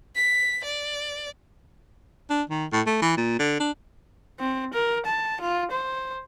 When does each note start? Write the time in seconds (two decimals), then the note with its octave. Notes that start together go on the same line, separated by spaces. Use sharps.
0.15 B6
0.64 D5
2.30 D4
2.49 D#3
2.72 A2
2.86 A3
3.02 E3
3.17 A#2
3.39 D3
3.60 D4
4.39 C4
4.73 A#4
5.06 A5
5.41 F4
5.72 C5